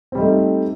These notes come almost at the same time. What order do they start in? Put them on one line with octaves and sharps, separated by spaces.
C4 G3 D#4 A3